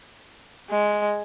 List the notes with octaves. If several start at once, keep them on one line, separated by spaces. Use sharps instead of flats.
G#3